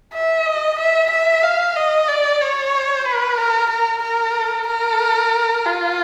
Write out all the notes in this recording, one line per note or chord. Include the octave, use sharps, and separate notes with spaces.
E5
D#5
E5
E5
F5
D#5
D5
C#5
B4
A#4
A#4
A#4
A#4
F4